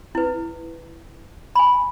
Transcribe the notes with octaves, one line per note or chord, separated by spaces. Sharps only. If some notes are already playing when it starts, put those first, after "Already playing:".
E4 B4
G#5 B5